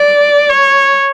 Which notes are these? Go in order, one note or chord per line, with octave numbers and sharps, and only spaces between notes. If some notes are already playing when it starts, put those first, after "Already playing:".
Already playing: D5
C#5